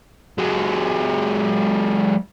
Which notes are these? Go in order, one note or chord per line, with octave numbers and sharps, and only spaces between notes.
F#3 G#3